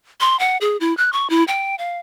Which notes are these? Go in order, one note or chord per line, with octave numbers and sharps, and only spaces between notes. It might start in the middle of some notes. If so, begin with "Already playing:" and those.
C6
F#5
G#4
E4
F#6
C#6
E4
G5
F5